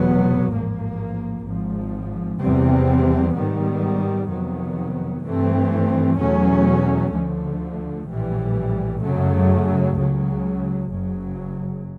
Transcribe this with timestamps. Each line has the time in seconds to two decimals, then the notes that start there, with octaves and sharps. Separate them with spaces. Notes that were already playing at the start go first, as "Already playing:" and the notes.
Already playing: F1 E2 B2 F#3 B3
0.50 A1 G#2 F3 A#3
1.44 G#1 G#2 F3
2.39 E2 C3 E3 G3 C4
3.33 G#2 D#3 G3 B3
4.27 F2 C3 D#3 F#3 B3
5.23 G2 E3 A3 C4
6.17 E2 B2 F#3 A3 C#4
7.12 D2 D3 F3 A3
8.07 A#1 A2 E3 G3
9.02 F#2 C#3 F#3 A3
9.96 C#2 C#3 F#3
10.90 F#1 F#2 C#3 F#3